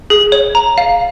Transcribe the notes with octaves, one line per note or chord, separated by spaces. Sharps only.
G#4
C#5
A#5
F5